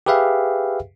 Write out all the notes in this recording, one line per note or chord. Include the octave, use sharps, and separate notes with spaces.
G4 G#4 B4 E5 F5 G5